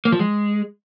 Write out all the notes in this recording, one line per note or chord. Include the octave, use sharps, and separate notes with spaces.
A#3
F3
G#3